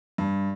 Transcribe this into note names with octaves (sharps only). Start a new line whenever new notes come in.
G2